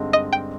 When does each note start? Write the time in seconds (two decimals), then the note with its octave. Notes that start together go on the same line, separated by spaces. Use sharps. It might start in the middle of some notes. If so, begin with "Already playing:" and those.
Already playing: G2 D3 G#3 C4 D#4
0.13 D#5
0.33 G5